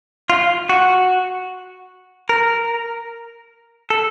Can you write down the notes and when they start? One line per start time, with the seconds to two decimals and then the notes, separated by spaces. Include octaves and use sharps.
0.30 F4
0.69 F#4
2.29 A#4
3.90 A4